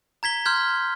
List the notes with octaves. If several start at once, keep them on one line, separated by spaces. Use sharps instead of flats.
A#5 G#6 B6 G7
C6 F6 G6 G#6